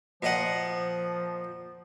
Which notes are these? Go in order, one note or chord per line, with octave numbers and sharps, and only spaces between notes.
A#2 F3 D#5 F#5